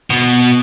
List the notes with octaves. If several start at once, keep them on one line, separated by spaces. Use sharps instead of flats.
B2